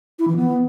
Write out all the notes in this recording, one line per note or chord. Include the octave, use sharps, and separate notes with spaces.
E4
E3
B3